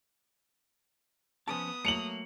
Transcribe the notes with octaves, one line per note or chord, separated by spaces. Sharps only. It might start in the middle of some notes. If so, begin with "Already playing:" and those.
F3 B3 C#4 A5 D#6
F#3 A3 A#3 C#7 F7 F#7